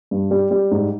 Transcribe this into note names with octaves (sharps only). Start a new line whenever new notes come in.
G2
G3
G3
G#2